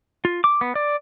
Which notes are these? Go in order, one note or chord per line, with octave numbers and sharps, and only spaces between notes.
F4
D6
B3
D5